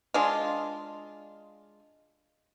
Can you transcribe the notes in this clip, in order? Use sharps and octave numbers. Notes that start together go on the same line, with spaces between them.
G#3 D4 F4